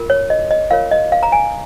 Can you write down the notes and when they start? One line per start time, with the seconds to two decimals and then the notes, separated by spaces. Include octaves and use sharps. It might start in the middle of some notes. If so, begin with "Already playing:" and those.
Already playing: F4 A#4
0.10 C#5
0.30 D#5
0.51 D#5
0.70 F4 A#4 C#5 F5
0.92 D#5
1.12 F5
1.23 A#5
1.32 G#5